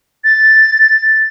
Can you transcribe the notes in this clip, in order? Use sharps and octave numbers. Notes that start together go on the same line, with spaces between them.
A6